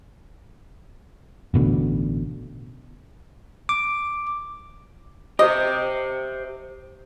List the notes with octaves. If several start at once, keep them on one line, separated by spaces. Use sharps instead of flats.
A1 B2 D3
D6
G4 C5 D#5